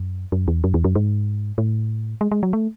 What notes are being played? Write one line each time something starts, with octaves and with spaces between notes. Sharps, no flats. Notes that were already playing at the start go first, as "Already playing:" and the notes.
Already playing: F#2
F#2
E2
F#2
E2
F#2
G#2
A2
G#3
G#3
F#3
A3